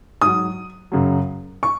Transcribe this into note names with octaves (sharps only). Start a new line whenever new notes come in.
G#2 F#3 D#6
F#2 C#3 F#3
C#6